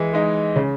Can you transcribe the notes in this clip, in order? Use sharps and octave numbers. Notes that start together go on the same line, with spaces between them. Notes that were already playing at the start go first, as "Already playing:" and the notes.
Already playing: E3 G#3
G#3 D#4
C#3